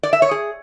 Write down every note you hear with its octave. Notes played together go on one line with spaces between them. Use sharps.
D5
E5
C#5
G#4